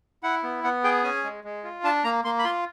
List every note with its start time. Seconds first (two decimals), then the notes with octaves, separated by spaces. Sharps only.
0.23 E4 F#5
0.43 B3
0.64 B3 F#5
0.84 G#4 G5
1.04 C#4 G#5
1.24 G#3
1.44 G#3
1.64 F4
1.84 D4 A5
2.04 A#3 A#5
2.24 A#3 C6
2.39 B5
2.44 F4 C6